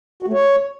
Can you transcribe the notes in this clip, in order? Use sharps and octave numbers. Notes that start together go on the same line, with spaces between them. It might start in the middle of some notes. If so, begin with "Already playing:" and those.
F#4
A3
C#5